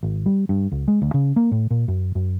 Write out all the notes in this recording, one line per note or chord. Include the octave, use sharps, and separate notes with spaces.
G#1
G3
G2
C#2
G#3
D2
C#3
A#3
A2
A#2
F#2
F#2